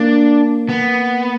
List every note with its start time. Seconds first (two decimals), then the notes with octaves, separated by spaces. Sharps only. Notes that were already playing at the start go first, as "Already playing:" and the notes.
Already playing: A#3 D4
0.69 B3